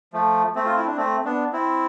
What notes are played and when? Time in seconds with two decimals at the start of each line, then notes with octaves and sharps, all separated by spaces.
0.13 F3 A3
0.55 A3 C4
0.66 F4
0.77 E4
0.87 D4
0.97 A3 C4
1.25 B3 D4
1.53 C4 E4